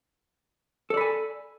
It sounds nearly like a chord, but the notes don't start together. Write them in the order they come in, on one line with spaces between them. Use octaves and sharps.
A4 D5 B5 G#5